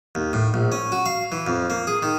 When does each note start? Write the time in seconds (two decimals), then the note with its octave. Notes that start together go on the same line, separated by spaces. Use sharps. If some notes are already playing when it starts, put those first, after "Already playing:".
0.15 D#2
0.33 A2
0.54 A#1
0.72 C#4
0.92 F#4
1.06 F5
1.32 E3
1.47 F2
1.70 A#3
1.87 G#4
2.03 D#3